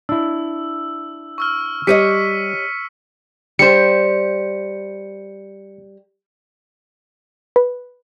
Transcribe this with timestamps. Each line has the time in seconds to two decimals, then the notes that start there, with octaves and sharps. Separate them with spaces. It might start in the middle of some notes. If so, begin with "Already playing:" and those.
0.09 D4 E4 E6
1.38 C#6 E6 F6
1.87 G3 G4 C#5 D#5 B6 C#7 D#7
3.59 G3 C5 C#7
7.56 B4